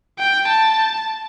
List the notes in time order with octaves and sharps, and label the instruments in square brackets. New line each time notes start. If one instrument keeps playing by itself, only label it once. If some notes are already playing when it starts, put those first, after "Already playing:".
[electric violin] G5
A5